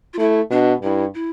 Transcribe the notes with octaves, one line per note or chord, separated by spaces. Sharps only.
F4
A3 E4
B2 D4
G2 E4
E4